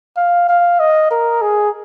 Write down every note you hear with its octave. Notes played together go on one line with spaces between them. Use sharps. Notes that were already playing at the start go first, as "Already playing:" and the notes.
F5
F5
D#5
A#4
G#4